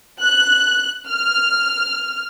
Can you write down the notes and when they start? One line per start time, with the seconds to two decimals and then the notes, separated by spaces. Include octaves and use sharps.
0.22 F#6
1.08 F6